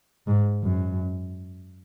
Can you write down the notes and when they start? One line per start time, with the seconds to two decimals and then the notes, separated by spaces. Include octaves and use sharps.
0.27 G#2
0.64 F#2